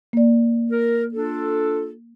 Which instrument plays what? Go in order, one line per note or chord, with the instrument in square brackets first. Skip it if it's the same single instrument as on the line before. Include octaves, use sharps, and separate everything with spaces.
[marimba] A#3 D5
[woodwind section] A#4
D4 F4 A4